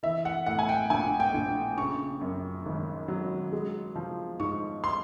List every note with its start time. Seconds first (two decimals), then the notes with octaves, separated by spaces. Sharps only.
0.03 E3 E5
0.25 F#5
0.46 A2 F#5
0.59 G#5
0.69 G5
0.90 A#1 G#5
1.20 G5
1.34 A#1
1.78 C#3 C#6
2.21 F#2
2.66 G#1
3.08 F#3
3.52 G#3
3.95 F3
4.39 G#2 C#6
4.84 C6